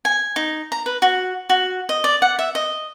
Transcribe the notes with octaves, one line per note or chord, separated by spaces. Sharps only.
G#5
D#4
A#5
B4
F#4
F#4
D#5
D5
F#5
E5
D#5